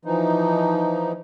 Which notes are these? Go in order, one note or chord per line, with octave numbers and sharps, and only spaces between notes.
E3 F3 D#4